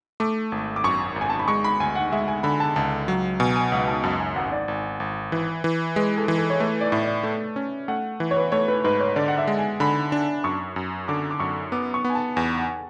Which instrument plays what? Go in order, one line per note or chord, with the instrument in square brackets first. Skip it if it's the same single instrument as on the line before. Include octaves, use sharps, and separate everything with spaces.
[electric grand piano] A3 [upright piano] D6
[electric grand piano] G#1
[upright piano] D6
[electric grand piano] F#2 [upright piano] C#6
[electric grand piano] G#1
[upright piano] G#5
A5
B5
[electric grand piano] G#3 [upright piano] C#6
[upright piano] B5
[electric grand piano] D2 [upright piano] G#5
[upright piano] F#5
[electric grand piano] G#3 [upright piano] E5
[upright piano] G#5
[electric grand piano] D3 [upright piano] B5
[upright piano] A5
[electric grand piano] C#2 [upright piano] A5
[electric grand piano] F#3
[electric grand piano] B2 [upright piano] G#5
[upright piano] G#5
[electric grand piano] C#2 [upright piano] F#5
[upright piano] A5
[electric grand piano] F#2 [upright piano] A5
[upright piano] G#5
[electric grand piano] G#1 [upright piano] F#5
[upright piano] D5
[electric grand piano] G#1
G#1
E3
E3
[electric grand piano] G#3 [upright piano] B4
[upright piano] A4
[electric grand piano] E3
[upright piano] A4
C#5
[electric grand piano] A3 [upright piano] B4
[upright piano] D5
[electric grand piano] A2 [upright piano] E5
[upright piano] D5
[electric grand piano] A3
C#4
[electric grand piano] A3 [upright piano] F#5
[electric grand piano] E3
[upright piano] C#5
B4
[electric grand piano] A3 [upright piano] C#5
[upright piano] B4
[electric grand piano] G#2 [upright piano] B4
[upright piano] C#5
[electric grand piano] D3 [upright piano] D5
[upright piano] F#5
E5
[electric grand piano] G#3
[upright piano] G#5
[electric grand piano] D3 [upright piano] B5
[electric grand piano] D4
[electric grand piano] F#2 [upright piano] C#6
[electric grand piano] F#2
[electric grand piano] D3 [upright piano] D6
[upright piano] D6
[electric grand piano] F#2 [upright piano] C#6
[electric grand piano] B3 [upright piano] D6
[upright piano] C#6
[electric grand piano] B3
[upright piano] G#5
A5
[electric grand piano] E2 [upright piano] G#5
[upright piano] F#5